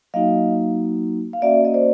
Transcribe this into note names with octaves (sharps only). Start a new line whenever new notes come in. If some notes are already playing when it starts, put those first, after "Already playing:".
F#3 A#3 D#4 F#4 D#5 F5
F5
A#3 C#4 F#4 D5 E5
D#5
C5 D5